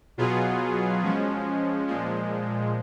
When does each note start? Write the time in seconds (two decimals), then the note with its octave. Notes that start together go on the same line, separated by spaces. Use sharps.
0.18 B2 F#3 B3 F4 G#4
1.02 F3 G#3 C#4
1.87 A#2 F3 G#3